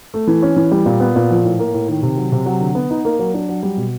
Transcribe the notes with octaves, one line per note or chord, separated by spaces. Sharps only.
A3
E3
C#4
E3
G3
A#2
B3
A#2
F3
A2
A#3
A2
D#3
C3
F#3
C3
F#3
D3
B3
D#4
A#3
F#3
D4
F#3
G3
B2